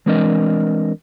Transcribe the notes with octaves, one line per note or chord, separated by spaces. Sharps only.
E3 G#3 C4 D4 A#4 D#5